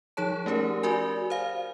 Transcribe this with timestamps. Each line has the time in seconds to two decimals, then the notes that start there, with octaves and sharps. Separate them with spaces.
0.17 F3 D#4 G#4 C#5 A5
0.46 A3 C#4 G4 A#4
0.83 F#4 A#4 D5 G#5
1.30 C5 F5